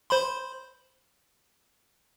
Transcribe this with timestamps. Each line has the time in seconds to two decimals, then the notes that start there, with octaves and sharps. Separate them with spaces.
0.10 C5 B5 C6